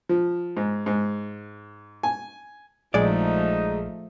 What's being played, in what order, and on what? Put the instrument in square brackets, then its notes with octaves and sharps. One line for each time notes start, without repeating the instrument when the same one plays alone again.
[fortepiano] F3
G#2
G#2
G#5
[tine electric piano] A#1 G#4 [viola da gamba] F3 A3 [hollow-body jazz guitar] G#3 D5 [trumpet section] D#4